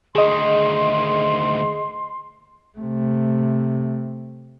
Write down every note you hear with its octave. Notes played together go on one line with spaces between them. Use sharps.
D2 D#3 G#4 D#5 C6
C3 A3